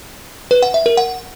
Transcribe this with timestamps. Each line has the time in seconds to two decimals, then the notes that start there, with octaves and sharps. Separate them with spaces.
0.51 B4
0.63 F#5
0.74 E5
0.86 A#4
0.97 F#5